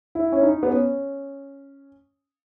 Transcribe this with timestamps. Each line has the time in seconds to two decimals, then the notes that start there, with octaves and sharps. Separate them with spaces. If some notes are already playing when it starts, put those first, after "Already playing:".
0.15 E4
0.32 C#4
0.43 D#4
0.63 B3
0.71 C#4